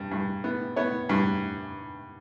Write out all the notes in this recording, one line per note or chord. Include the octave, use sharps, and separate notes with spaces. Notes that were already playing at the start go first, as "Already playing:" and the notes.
Already playing: G2
G2
B3
B3 C#5
G2